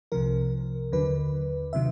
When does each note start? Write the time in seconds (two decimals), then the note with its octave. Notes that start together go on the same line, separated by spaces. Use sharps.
0.12 C2 C3 F3 A#4
0.92 D#2 D3 F#3 B4
1.73 C3 D#3 F#3 E5